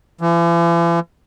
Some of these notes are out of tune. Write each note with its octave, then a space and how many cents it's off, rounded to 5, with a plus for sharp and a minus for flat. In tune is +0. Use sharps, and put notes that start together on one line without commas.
E3 +45